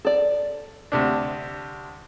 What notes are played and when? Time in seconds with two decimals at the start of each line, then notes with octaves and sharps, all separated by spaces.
0.05 A4 D5
0.92 D2 C3 D4